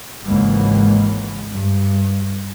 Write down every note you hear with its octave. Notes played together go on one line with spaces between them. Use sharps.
G#1 C#2 G#2 E3 A#3
G2